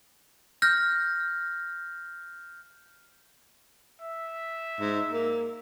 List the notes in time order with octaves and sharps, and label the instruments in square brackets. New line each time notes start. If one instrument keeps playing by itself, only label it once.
[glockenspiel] F6 G6 A#6
[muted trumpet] E5
[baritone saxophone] G#2
A#3